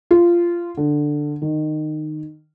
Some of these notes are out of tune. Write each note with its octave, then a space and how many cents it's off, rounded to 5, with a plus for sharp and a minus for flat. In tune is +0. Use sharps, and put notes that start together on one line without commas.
F4 -15
D3 +10
D#3 -20